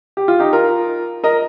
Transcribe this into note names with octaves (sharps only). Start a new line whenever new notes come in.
G4
F4
D#4 G4
F4 A#4
A#4 D#5